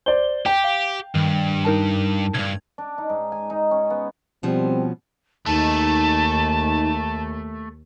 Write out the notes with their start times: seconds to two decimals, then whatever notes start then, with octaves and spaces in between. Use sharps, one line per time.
0.06 C5 D5 G7
0.46 G4 G5
0.64 F5
1.15 G2 D#3
1.65 D#4 A#4 A5
2.34 C2 G2 G#6
2.78 D4
2.98 D#4
3.09 G#2
3.32 G#5
3.50 D#4
3.71 C#4
3.90 B3
4.43 B2 F3 G3 C4 C#4
5.46 D#2 A3 D#4 A5